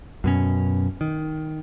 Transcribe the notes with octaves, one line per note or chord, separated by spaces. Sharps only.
F#2 B2 C#4
D#3